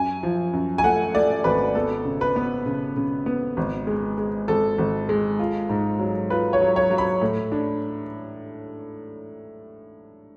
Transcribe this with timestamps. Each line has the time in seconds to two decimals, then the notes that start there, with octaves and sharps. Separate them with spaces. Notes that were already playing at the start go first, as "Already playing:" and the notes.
Already playing: F#2 G#5
0.23 F3
0.53 F#2
0.78 G#5
0.84 A3 F#5
1.15 A3 D5
1.44 G#1 B4
1.75 B3 A4
2.05 C#3
2.21 B4
2.36 B3
2.66 C#3
2.97 C#3
3.26 B3
3.57 G#1
3.87 G#3
4.18 G#3
4.48 G#1 A4
4.78 G#1
5.09 G#3
5.39 F4
5.69 G#2
5.99 F#3
6.30 F4 B4
6.53 C#5
6.61 F#3
6.76 C#5
6.90 F#3
6.98 B5
7.22 A2
7.52 D4